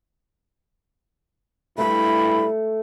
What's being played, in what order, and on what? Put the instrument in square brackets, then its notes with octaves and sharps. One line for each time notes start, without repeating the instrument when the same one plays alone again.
[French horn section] G2 G3 E4 [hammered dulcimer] A3 C#6 [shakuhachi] B5